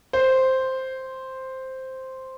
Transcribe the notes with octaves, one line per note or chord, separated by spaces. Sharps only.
C5